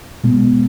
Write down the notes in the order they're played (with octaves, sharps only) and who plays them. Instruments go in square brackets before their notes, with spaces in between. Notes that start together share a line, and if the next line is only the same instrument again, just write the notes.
[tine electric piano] B2 G#3 B3